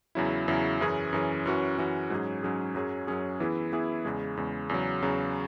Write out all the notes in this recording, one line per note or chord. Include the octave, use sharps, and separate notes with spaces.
E2 C#3 F#3 E4
E2 C#3 F#3 E4
F#2 E3 C#4 G#4
F#2 E3 C#4 G#4
F#2 E3 C#4 F#4
F#2 E3 C#4 F#4
G#2 F#3 C#4 G#4
G#2 F#3 C#4 G#4
F#2 F#3 C#4 G#4
F#2 F#3 C#4 G#4
E3 B3 E4 G#4
E3 B3 E4 G#4
E2 C#3 G#3
E2 C#3 G#3
E2 C#3 F#3
E2 C#3 F#3